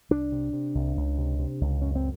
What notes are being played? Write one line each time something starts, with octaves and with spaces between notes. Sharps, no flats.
C2 D4
C3
C3
C2
C#2
C3
C3
C#2
F#2 C#4
C4